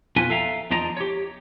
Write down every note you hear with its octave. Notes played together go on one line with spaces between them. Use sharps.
F2 B2 F4 B4 G#5
A4 E5 F5 G5 A#5
E2 F3 D4 D#5 A#5
G4 C#5